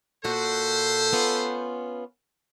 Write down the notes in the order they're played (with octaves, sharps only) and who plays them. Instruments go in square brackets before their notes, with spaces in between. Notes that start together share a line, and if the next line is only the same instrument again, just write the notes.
[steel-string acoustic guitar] A#2 F#4 [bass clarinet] A4 [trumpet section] B4 C5
[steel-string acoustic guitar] B3 C#4 F4